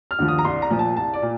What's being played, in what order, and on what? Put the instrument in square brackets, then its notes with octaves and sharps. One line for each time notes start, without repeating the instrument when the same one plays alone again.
[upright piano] F6
D#2 D3 F3
D#6
A#5
C2 C6
A#5
A#2 F3
A5
C2 A5
D5
A#2